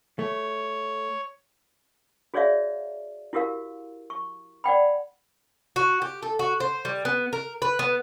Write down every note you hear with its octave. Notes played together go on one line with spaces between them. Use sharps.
A3 C#5
F#4 G#4 C#5 D5 E5 F5
E4 F#4 G4 A#4 F5
C#6
D5 F#5 G5 B5
F#4
G4
A4
F#4
C5
G3
B3
A#4
B4
B3